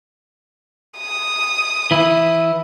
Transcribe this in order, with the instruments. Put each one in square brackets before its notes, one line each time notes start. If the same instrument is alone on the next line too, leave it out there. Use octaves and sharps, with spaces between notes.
[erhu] D#6
[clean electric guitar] E3 E4